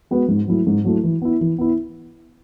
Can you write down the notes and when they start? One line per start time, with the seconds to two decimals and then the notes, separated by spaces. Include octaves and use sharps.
0.11 G#3 B3 F#4 B4
0.28 G#2
0.47 F#3 A3 E4
0.67 G#2
0.84 F#3 A3 E4
1.03 E3
1.22 B3 E4
1.41 E3
1.58 B3 E4